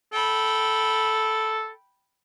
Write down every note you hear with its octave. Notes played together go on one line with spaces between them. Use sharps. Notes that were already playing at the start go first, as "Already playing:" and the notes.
A4 G5 B5